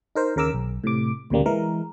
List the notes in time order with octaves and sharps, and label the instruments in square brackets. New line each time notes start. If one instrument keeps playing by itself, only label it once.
[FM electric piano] D#4 A#4 C5
D#2 C#3 A#4 D6 E6
B1
A2 C3 D6
D2 A#2 C#3 G3 A#3
E3 G#3 A#4